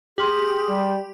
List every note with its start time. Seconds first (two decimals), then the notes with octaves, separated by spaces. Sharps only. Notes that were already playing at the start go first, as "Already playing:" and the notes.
0.18 G4 G#4 C6 F6 F#7
0.69 G3